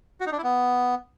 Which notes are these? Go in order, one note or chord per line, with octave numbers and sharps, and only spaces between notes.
F#4
D#4
D4
E4
B3